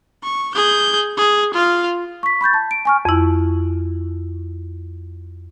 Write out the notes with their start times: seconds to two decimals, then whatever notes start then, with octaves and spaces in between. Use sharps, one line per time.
0.24 C#6
0.55 G#4 G6
1.18 G#4
1.54 F4 F5
2.23 C#6 B6
2.41 B5 C#6 G6 A6
2.54 A5
2.71 D7
2.85 G#5 C#6 F6
3.05 F2 E4